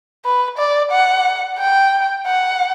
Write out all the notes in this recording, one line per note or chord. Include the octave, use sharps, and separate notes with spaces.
B4
D5
F#5
G5
F#5